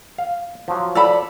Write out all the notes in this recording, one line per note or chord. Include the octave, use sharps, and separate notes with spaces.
F5
F3 F#3
A4 D5 B5